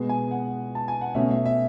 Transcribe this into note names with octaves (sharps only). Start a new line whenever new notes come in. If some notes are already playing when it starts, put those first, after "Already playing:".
Already playing: B2 G#3 B3
G#5
F#5
A5
G#5
F#5
B2 A3 C#4 E5
E5
E5